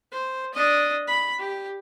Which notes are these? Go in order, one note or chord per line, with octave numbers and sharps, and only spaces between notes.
C5
D4 D#5
B5
G4